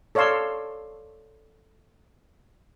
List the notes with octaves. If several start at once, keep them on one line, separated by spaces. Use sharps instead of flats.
A4 C#5 D5 F5 C6 E6